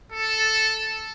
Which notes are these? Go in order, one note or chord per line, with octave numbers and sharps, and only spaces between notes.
A4